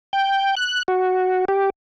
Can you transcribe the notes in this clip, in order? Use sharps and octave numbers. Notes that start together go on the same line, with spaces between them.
G5
F#6
F#4
G4